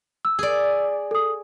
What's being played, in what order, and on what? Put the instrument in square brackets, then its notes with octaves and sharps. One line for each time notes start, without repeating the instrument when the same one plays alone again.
[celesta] E6
[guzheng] G#4 D5
[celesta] A4 D#6